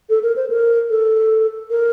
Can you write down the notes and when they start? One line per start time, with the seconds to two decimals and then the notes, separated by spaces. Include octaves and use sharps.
0.09 A4
0.23 A#4
0.36 C5
0.50 A#4
0.90 A4
1.70 A#4